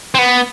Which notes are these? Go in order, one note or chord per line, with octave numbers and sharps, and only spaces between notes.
C4
B3